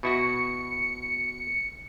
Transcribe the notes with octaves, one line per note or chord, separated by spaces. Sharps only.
B2 E4 F#4 C#7